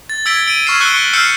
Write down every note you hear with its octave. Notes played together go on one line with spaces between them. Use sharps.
A6
E6 G#6 A6 B6 D7 G7
D7 D#7
C#6 F6 G#6 C7 E7
C#6 E6 F#6 C#7 G7
E6 F6 G6 C7 C#7 E7